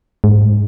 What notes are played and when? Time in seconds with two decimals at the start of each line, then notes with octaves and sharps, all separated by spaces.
0.24 G#2